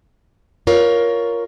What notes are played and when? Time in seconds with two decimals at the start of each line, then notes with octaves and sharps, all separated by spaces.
0.67 F4 A#4 C#5